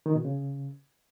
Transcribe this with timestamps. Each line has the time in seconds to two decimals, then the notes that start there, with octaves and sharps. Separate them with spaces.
0.06 D#3
0.15 B2
0.25 C#3